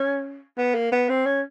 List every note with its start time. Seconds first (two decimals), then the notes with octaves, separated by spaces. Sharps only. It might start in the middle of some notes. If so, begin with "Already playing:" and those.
Already playing: C#4
0.58 B3
0.74 A#3
0.92 B3
1.09 C4
1.26 C#4